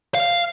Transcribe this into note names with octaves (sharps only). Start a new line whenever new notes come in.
F5